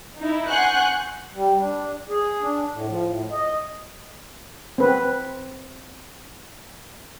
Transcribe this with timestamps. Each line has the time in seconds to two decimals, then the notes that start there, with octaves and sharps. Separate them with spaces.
0.18 D#4 E4
0.48 F#5 G#5 C6 C#6 F#6 G6
1.35 G3
1.59 D4
2.09 G#4
2.41 D4
2.72 A2
2.90 F3
3.06 A2
3.31 D#5
4.78 C4 B4